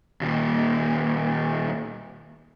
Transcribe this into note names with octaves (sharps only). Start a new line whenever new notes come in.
D#2 A#2